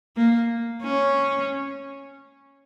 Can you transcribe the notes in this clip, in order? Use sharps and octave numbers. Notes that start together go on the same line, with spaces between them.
A#3
C#4